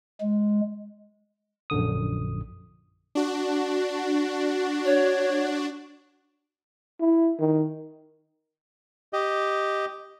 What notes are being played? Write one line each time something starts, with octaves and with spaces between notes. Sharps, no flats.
G#3
A#1 F#2 D3 D#6
D4 F#4
C#5
E4
D#3
G4 D#5